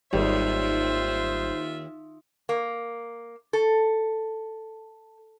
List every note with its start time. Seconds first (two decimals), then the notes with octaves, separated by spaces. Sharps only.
0.13 G#1 D#2 G3 F4 C5 E5
2.49 A#3
3.53 A4